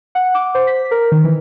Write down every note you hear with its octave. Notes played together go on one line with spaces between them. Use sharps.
F#5
D6
C5
B6
A#4
D#3
E3